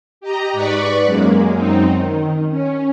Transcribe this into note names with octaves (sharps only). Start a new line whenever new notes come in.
G4 D#5 A#5
G#2 B4 D5 B5 C#6 F#6
F#2 G#3 A#3
F#2 C4 D#4
D#3
C#4